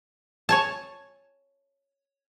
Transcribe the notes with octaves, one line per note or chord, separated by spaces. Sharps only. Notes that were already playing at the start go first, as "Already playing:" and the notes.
C#5 G#5 A5